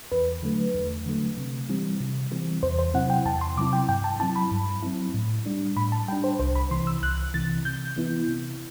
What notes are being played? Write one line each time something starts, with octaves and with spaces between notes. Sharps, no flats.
E2 B4
D3 F#3 A3
E2
D3 F#3 A3
C3
E3 G3 C4
C3
E3 G3 C4
E2 C5
C5
C3 F#3 C4 E4 F#5
G5
E2 A5
C6
C3 F#3 C4 E4 D6
G5
G2 G5
A5
F#3 C4 E4 A5
B5
G2
F#3 C4 E4
A2
G3 D4
A2 B5
A5
G3 D4 G5
C5
C2 C5
B5
C3 E3 C6
E6
C2 F#6
C3 E3 A6
C3 G6
E3 B3 E4
C3